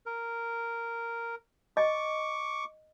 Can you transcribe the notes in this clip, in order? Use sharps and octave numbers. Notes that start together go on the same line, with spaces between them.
A#4
D#5 C#6 D6